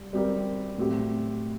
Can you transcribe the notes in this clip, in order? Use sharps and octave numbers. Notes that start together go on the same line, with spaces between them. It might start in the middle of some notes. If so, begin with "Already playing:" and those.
Already playing: G3
G3 C4 G4 A#4
A2 F#3 C4 G4